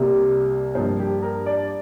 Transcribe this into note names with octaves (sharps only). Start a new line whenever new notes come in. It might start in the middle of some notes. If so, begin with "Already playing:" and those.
Already playing: C2 C3 G3 A#3
G2 F3 A#3 C5
G4
A#4
D5